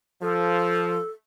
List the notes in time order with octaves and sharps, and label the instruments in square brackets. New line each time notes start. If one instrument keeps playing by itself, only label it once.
[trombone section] F3 [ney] A4